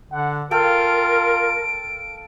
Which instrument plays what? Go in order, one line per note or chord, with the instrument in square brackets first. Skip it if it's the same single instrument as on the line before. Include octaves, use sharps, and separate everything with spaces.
[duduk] D3 [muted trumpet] F#5
[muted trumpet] F4 [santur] A4 F5 G5 [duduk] A#4 [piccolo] D7